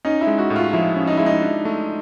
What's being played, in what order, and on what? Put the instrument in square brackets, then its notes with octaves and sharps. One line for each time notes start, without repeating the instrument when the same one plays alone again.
[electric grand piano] C#4 [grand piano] D#4
[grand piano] E4
[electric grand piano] G#3
[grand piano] F#4
[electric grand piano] A2
[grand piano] F4
[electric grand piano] F3 [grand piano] E4
[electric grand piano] C#4
[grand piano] D#4
[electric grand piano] G#3 [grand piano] E4
[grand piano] D#4
[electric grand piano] D4
A3